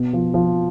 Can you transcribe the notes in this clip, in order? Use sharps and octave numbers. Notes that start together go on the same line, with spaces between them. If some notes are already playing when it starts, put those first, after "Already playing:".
Already playing: B2 B3
F3
F3